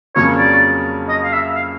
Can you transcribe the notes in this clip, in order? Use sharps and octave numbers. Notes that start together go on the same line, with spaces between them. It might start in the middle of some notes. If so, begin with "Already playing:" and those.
F2 C#3 F#3 A#3 C#4 C#5
D5
D#5
F5
E5
F5